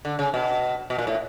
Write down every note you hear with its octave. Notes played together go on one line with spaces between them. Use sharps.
D3
C#3
B2
B2
A#2
A2